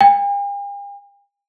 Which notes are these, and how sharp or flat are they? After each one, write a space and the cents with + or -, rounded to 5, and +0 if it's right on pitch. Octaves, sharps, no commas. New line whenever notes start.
G5 +45